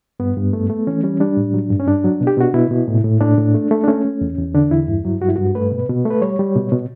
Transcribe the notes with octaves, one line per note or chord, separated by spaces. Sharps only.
G2 B3
G2
A3
A3
E3 C#4
G3 C#4
G3 D4
A2
F#3
G2
C#4
G2 D4
F#3
B2
G4
B2 F#4
B2 E4
B2
A2
A2
A2 D4
A2
A3
A3
D4
A3 C#4
A3
E2
E2
D3 D4
E2 E4
G2
F#3
G2 F#4
E4
G2 F#4
A3 B4
B2
B2
A3
B4
G3 C#5
G3
B2
B2